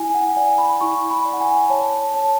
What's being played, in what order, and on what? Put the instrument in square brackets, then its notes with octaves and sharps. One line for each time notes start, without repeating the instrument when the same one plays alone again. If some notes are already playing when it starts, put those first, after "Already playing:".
Already playing: [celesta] E4 G#5
F#5
D5 G#5
B5
E4 C#6
B5
D5
F#5
G#5
C#5 A5
C#5 A5